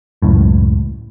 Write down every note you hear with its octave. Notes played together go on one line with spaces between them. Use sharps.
C#2 F#2 A2